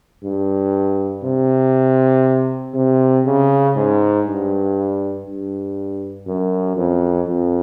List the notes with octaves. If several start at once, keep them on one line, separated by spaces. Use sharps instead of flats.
G2
C3
C3
C#3
G#2
G2
G2
F#2
F2
F2